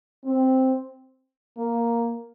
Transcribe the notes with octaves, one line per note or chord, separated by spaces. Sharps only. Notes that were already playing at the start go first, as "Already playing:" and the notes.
C4
A#3